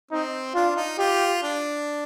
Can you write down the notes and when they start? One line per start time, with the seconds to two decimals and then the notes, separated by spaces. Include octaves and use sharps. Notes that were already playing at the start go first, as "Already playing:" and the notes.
0.11 C4 D#4
0.54 D4 F4
0.76 D#4
0.98 F4 G4
1.43 D4